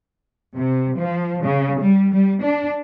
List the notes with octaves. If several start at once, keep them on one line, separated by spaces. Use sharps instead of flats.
C3
F3
C#3
G3
G3
D4